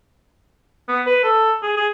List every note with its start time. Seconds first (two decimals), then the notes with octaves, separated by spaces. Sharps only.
0.88 B3
1.06 B4
1.24 A4
1.63 G#4
1.77 G#4